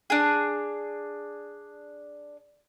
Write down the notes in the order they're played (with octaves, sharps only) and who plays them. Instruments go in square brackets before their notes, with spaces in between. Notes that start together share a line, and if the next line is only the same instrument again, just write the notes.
[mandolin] D4 G#4